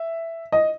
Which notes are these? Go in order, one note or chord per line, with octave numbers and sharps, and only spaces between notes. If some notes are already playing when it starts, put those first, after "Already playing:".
Already playing: E5
D#5